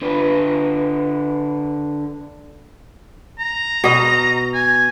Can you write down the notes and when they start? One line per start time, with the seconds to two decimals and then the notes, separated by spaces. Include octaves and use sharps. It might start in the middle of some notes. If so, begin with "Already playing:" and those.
0.02 D3 B4
3.39 A#5
3.84 B2 D#5
4.54 G#5